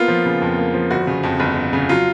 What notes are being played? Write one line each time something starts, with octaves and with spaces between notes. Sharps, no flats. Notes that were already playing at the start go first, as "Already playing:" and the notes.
Already playing: A#3 B3 F4
F3
C#3
F2
A#3
F3
G1 F#4
C#3
F2
G1
G1
C#3
F#3 F4